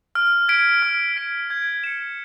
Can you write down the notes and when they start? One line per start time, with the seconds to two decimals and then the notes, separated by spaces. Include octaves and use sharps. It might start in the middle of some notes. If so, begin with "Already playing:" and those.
0.15 F6
0.48 G#6 B6 D7
0.82 F6
1.16 G#6 B6 D7
1.50 G#6
1.84 C#7 E7